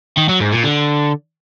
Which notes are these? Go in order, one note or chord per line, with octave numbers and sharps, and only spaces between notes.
D#3
F#3
G#2
A#2
D3